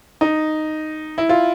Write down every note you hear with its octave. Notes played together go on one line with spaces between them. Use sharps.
D#4
E4
F4